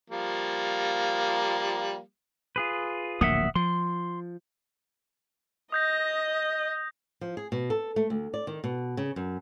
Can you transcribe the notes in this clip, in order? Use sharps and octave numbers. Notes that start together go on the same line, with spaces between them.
F3 G3 A#3
F4 G#4 B4
D1 A#1 A#3 E5 F#5 D#6
F3 C6
D#5 D#6 G6 A#6
F3
G#4
B2
A4
A3
D2
D5
D#3
B2
C#3
F#2